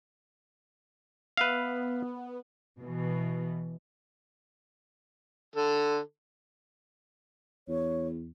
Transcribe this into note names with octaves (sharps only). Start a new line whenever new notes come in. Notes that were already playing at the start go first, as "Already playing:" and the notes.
B3 B4 E5 F5
B2 E3
D3 A4
E2 C#5